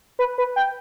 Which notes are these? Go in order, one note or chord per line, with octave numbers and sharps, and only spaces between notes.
B4
B4
G5